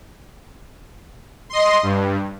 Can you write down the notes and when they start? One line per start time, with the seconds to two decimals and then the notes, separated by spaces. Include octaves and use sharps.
1.50 D#5 C6
1.83 G2